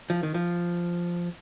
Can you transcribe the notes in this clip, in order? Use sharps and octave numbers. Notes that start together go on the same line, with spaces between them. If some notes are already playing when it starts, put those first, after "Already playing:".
F3
D#3
F3